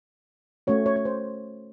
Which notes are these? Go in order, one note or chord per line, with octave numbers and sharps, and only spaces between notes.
A3 C#4 F#4 C#5
C#5
C#5
C5